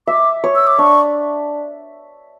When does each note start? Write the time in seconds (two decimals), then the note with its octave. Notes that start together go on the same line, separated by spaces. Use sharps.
0.07 E5 D6
0.44 C#5
0.55 E6
0.67 D6
0.78 D4 C#6